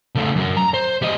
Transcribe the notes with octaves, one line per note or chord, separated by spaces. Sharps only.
C#3 A3
F#2
A#5
C5
G3 D#5